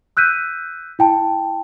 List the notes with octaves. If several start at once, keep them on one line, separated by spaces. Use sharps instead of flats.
E6 F#6 G6 B6 D#7
E4 G5 A5